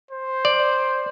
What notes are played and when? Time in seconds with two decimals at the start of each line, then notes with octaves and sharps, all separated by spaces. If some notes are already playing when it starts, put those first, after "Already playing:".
0.11 C5
0.45 D5